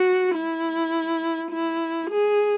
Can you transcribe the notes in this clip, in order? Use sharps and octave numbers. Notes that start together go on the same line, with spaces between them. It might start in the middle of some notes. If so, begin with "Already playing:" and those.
Already playing: F#4
E4
E4
G#4